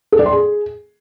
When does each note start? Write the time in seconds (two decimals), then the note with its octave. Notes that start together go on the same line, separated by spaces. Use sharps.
0.12 A4
0.19 D5
0.26 C6
0.32 G#4